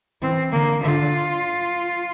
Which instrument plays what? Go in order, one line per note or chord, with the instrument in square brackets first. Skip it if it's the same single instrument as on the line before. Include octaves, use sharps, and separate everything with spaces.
[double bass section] E3 [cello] C4
[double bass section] D3 [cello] A#3
[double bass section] D3 [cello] F4